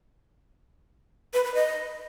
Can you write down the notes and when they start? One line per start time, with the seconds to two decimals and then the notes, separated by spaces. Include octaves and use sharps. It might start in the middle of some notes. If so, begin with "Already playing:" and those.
1.34 B4
1.44 B4
1.55 D#5